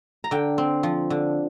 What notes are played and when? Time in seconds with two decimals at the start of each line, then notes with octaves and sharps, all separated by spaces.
0.24 A#5
0.31 D3 G5
0.58 C4
0.83 F3
1.10 D3